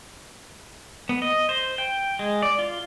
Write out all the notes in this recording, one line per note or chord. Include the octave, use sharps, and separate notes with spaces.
B3
D#5
C5
G5
G#3
D5
F4